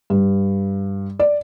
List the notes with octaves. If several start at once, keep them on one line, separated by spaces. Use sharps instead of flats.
G2
D5